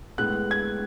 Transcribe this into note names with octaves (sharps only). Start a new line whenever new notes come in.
A2 G#3 B3 F#6
G#6